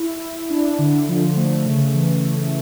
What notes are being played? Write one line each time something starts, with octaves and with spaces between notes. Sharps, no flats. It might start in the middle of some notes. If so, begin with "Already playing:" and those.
Already playing: E4
E4
D4
D3
F3
A3
C#3
E3